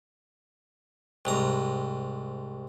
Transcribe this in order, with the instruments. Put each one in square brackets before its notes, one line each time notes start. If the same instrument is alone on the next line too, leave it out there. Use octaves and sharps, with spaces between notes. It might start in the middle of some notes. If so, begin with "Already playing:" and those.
[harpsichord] C2 G#2 A#5